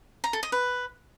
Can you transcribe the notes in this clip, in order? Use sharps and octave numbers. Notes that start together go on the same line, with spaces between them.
A#5
A4
D#5
B4